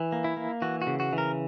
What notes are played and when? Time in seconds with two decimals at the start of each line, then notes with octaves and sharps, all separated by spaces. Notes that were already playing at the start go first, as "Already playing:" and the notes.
Already playing: E3
0.12 A#3
0.24 E4
0.37 A#3
0.62 E3 F#4
0.82 F#4
0.87 C#3
1.00 F#4
1.13 E3
1.18 A#4